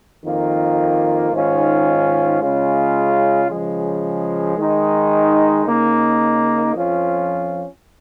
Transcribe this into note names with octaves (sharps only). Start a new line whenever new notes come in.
F2 D#3 A#3 F4
G#2 D#3 C#4 F4
C#3 G#3 C#4 F4
C#3 F3 G#3
D#3 G#3 D#4
C#3 A#3 D#4
F2 F3 C#4 F4